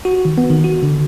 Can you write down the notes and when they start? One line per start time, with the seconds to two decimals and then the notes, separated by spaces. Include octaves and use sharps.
0.05 F#4
0.25 D#3
0.38 B3
0.50 D#3
0.64 F#4
0.83 D3